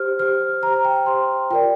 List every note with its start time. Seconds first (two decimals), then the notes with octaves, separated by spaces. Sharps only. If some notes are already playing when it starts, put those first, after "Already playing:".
Already playing: G4 C5 F6
0.19 G4 C5 F6
0.62 G4 A#5
0.67 C5
0.74 A#5
0.85 G5
0.96 G5
1.06 G4 C5 C6
1.51 F4 A#4 D5 G5